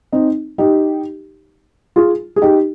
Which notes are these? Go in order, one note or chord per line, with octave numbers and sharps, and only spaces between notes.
C4 D#4
D#4 G4
F4 G#4
G#4
D#4 G4